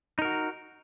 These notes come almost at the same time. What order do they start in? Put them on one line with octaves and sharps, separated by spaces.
D#4 A#4 F#4